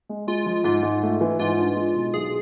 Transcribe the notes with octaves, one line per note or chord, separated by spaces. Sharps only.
G#3
G#3 F4
F3
G#2 F4
G#2
A3
E3
G#2 F4
D4
G#3
B2
B1 G#4